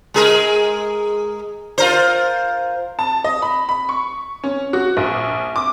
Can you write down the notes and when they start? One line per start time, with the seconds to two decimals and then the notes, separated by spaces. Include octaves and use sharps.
0.14 G#3 G#4 A#4
1.78 F4 A#4 C5
2.99 A5
3.24 D#5
3.42 B5
3.69 B5
3.89 C#6
4.44 C#4
4.73 F#4
4.97 A#1
5.56 D6